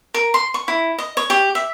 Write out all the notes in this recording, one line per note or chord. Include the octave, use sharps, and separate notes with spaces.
A#4
C6
C#6
E4
D#5
C#5
G4
E5